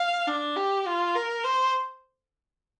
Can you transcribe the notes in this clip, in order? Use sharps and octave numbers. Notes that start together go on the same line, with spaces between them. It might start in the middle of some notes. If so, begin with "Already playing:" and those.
Already playing: F5
D4
G4
F4
A#4
C5